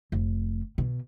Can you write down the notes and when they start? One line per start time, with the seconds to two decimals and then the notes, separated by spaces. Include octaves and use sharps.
0.12 F1
0.78 B2